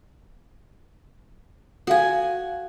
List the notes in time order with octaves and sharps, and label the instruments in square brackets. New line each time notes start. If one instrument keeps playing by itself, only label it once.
[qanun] F#4 G#5 [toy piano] A4 F5